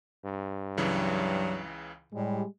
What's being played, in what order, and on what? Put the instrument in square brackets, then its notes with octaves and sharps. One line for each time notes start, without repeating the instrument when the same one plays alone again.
[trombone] G2
[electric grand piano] C#2 C#3 E3 [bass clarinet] F#3
[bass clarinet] A2 [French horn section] G3 G#3